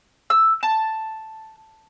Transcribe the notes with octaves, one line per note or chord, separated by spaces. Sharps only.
E6
A5